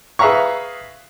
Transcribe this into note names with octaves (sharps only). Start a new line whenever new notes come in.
G#4 B4 E5 F5 A#5 C#6